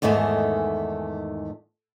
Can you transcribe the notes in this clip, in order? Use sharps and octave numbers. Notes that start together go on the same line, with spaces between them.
E2 G#2 D#3 A3 G#4